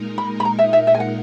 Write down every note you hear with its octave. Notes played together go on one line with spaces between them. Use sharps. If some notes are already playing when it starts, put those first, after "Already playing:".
Already playing: A#2 G#3 D#4 A#4
B5
B5
A#5
E5
E5
E5
G#5
F#5